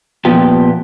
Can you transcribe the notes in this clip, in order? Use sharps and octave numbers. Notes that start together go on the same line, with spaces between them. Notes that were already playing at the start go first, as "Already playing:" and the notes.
A#2 F3 B3 G4